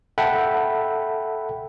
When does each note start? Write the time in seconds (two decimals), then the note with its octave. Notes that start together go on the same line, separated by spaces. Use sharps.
0.18 A4 E5 F#5 G5 B5